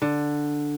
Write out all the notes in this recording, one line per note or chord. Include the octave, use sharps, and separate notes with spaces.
D3